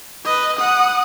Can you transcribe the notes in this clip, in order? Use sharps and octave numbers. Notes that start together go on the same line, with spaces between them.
B4 D#5
F#5 D#6